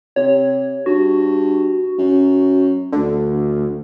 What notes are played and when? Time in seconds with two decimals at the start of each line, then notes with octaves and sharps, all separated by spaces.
0.16 C3 C#5
0.86 G2 F#4
1.98 F#2
2.93 D2 D3